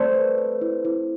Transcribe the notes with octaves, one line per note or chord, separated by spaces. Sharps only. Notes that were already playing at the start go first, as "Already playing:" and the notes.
Already playing: A3 C4 D5
B4
B4
E4
E4